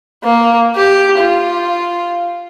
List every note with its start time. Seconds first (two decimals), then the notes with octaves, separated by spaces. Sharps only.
0.23 A#3
0.76 G4
1.18 F4